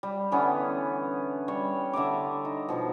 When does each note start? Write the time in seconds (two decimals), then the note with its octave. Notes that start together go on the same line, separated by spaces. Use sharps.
0.03 G3
0.32 D3 E3 B3 C#4
1.48 G3 C#5
1.93 D3 E5 A#5 D6
2.45 D#4
2.69 B2 F3 B3